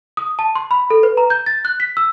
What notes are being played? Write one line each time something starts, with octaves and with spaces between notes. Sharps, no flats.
D#6
A5
C6
B5
A4
B4
A#5
G6
A6
F#6
B6
E6